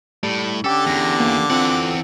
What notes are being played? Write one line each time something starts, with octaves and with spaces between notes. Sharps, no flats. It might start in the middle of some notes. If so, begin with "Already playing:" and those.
A2 G3
D3 C#4 G4 A4 D6
E2 A#6
A#3
E3 C4 F4 A4 F#5